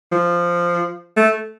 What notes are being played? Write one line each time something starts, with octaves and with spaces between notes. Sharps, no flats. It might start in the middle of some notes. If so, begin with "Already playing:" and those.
F3
A3